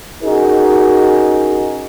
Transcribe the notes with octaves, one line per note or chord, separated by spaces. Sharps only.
C#4 D#4 F#4 G#4 A#4